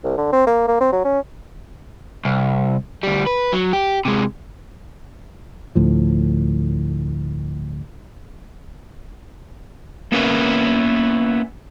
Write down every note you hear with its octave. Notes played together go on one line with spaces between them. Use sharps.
C2
D3
C4
A#3
A#3
C4
F#3
C#4
C2
D2 G3
B4
F#3
G4
C3 G#3
D2 A2 F3
A#3 B3 C#4 E4 A#4 B4